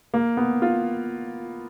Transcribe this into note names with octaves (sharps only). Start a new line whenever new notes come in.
A#3
B3
F4